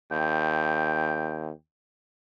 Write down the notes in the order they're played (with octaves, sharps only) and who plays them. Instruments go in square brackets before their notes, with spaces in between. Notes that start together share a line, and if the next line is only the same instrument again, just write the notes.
[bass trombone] D#2 [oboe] G5